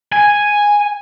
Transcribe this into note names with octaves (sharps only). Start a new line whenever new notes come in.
G#5